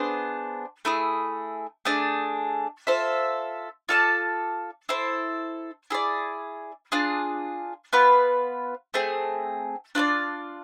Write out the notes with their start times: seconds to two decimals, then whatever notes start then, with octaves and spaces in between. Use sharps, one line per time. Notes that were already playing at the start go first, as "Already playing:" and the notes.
Already playing: B3 D4 G#4 C5
0.85 A3 E4 G#4
1.85 A3 D4 G#4
2.87 F4 A4 C5 E5
3.89 F4 A4 D5 A5
4.89 E4 A4 C5
5.90 E4 G#4 D5
6.92 D4 F4 G#4
7.93 B3 F4 B4
8.94 A3 C4 G#4
9.95 D4 F4 A4 D5